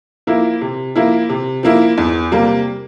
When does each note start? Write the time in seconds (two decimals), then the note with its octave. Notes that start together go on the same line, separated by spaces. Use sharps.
0.27 F3 A#3 E4
0.61 C3
0.95 F3 A#3 E4
1.29 C3
1.63 F3 A#3 E4
1.98 E2
2.31 C3 G3 A#3